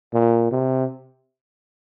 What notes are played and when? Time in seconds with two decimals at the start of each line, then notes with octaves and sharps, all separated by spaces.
0.14 A#2
0.51 C3